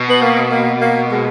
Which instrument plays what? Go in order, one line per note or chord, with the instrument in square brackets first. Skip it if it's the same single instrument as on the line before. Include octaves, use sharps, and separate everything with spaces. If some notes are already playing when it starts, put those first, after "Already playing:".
Already playing: [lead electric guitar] B2
[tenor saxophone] B3
A#3
A#3
A#3
G#3